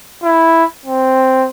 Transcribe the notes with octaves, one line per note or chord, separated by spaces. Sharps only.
E4
C4